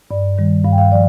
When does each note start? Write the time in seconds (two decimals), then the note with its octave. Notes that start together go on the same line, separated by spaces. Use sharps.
0.11 G2 D5
0.38 D#3 G3
0.64 G2 F5
0.72 G5
0.78 F5
0.91 F3 D5